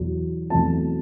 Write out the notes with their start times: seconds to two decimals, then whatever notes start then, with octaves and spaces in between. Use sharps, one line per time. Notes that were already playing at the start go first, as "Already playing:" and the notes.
Already playing: E2 B2 F#3
0.50 E2 B2 F#3 A3 C4 A5